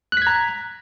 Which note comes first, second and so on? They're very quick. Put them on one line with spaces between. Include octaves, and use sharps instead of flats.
F#6 B6 G#6 A#5